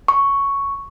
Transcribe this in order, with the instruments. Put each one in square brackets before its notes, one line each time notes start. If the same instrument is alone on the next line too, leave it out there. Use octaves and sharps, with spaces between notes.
[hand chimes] C#6